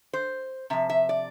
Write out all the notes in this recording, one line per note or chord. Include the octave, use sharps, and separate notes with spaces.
C5
C3 F3 E5
E5
D5